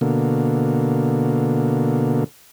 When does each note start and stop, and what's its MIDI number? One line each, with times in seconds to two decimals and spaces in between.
0.01 2.24 47
0.01 2.24 50
0.01 2.24 58